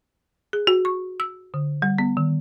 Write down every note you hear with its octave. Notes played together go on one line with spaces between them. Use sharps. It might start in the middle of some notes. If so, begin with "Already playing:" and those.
G#4
F#4
C#6
E6
D3
G3
B3
D#3